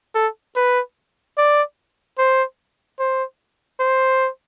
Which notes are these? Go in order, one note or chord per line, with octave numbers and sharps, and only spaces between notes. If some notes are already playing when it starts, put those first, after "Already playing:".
A4
B4
D5
C5
C5
C5